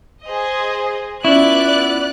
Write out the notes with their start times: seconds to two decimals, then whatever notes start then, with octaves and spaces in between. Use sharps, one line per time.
0.24 G#4 C5 D#5
1.25 B3 C#4 E4 F4 D5 F#6